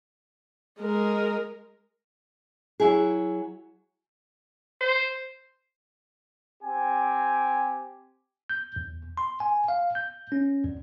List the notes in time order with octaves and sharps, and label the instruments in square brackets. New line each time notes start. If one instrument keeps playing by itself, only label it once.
[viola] G#3 A#4
[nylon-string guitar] F#3 E4 G#4
[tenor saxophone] C5
[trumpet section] C4 G4 G#5
[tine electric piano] G6
E2
C6
G#5
F5
G6
C#4
E2